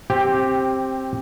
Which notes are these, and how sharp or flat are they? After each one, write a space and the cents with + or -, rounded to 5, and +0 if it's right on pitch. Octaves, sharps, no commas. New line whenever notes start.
C4 +15 G4 +0